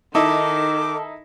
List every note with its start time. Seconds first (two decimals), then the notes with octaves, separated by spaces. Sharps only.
0.15 D#3 D#4 E4 A4 D6